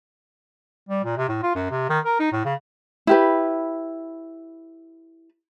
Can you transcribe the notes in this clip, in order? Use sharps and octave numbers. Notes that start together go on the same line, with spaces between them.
G3
A#2
C3
A2
F4
F#2
C3
D#3
A#4
D#4
A2
C#3
E4 G4 B4